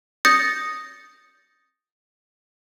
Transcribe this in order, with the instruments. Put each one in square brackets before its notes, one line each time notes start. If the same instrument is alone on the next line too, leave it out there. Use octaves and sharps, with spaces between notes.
[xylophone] D#6 G6 A6 A#6 C#7